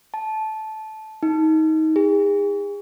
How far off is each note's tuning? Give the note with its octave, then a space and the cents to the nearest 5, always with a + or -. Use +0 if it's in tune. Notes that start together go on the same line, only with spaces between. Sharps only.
A5 -15
D#4 +25
G#4 -40